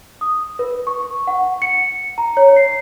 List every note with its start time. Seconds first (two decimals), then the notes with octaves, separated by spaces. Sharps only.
0.21 D#6
0.59 B4
0.87 C#6
1.27 F#5
1.62 C#7
2.18 A#5
2.37 C#5
2.56 C7